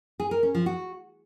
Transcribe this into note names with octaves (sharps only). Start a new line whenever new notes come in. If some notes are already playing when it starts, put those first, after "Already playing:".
G#4
A#4
C#4
F3
F#4